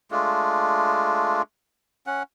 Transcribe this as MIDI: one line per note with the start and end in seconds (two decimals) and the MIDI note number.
0.11 1.42 56
0.11 1.42 57
0.11 1.42 62
0.11 1.42 65
2.07 2.23 61
2.07 2.23 78